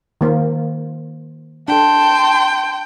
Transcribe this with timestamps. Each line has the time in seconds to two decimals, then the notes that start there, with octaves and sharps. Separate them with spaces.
0.21 D#3 A#3 C5
1.68 D4 A4 G5 A5 C6